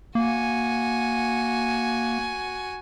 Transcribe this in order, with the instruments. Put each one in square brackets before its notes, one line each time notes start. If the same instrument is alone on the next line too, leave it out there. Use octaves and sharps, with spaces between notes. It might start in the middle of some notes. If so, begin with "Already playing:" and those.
[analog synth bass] A#3 [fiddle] F#4 G#5